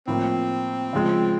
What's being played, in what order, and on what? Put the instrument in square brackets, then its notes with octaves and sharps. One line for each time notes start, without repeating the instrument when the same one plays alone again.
[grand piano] A2 F3 A#3 [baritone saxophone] C4
[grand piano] C#3 F3 G#3